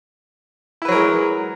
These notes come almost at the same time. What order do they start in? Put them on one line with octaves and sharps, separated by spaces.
E4 B4 F#3 A#4 G#3